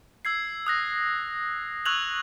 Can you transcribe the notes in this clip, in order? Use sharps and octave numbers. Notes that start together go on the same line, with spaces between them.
E6 G#6 C7
D#6 F#6 A#6
C#6 E6 F#6 G#6 F7 F#7